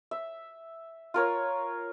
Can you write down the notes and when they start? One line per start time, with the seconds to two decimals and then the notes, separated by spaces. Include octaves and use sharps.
0.11 E5
1.14 F4 A#4 C#5